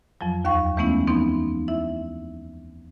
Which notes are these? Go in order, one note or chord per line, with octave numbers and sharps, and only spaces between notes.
F2 F3 F#3
D#2 F5 G5 C#6
E3 G#3 A3 B3 C#4 E4
E3 F3 B3 C4 D#4
E4 E5